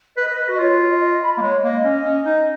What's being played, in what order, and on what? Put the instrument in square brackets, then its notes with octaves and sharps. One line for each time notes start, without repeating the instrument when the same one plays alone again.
[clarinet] B4 [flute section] D#5
[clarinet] B4
B4
F#4
[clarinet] F4 [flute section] C#5
[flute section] B4
C#5
D#5
D#5
D#5
B5
A#5
[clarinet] A#3
[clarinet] G#3 [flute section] C#5
[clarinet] A#3 [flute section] D#5
[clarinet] C#4
C#4
D#4